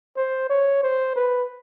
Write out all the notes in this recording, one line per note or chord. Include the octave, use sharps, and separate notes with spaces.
C5
C#5
C5
B4